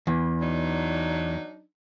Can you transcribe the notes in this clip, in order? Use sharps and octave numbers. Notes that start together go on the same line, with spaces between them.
E2 E3
F#3 D4 D#4